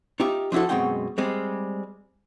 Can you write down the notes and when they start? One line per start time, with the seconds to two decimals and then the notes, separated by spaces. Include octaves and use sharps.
0.20 D#4 F4 G4 E5
0.52 F3 D4 E4 F#4 A4
0.69 F#2 B2 G#3 C4 F#5 G5
1.18 G3 G#3 C4